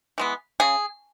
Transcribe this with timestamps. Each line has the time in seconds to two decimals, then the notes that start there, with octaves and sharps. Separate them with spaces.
0.18 E3 G#3 B3
0.60 C#3 G#4